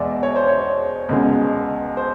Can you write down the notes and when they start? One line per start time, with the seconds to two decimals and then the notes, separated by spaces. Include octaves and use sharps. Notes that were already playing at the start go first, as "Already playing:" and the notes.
Already playing: E2 B2 G#3 D5 E5
0.23 C#5
0.36 C5
0.48 C#5
1.09 C#2 B2 G#3
1.97 C5